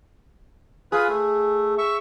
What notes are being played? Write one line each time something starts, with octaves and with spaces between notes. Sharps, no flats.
F4 G#4 B4
A3
E5 C#6